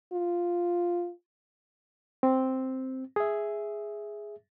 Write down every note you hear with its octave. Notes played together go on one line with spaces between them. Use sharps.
F4
C4
G#4 E5